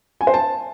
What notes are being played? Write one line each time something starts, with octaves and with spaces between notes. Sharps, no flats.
G#5
C5
A5